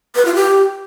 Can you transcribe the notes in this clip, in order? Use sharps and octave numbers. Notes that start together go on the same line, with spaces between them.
B4
F4
G4